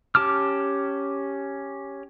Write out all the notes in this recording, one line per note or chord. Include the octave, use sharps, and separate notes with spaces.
C#4 G4 A5 D6 F6